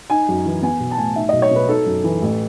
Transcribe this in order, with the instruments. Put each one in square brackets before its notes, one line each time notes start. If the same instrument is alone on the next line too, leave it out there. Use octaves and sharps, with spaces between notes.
[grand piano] D#4 G#5
F#2
E3
B3 G#5
B1
A5
A2 G#5
D#4 E5
B1 D#5
C#5
B2 B4
D#4 A4
F#2
E3
A1